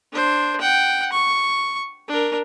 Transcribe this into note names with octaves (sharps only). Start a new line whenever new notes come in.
D4 C5
F#5 G5
C#6
D4 A#4